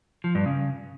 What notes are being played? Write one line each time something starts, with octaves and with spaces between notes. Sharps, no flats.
F3
G2
C#3